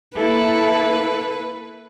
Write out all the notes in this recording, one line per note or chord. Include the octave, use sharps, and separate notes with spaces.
A#3 E4 A4 B4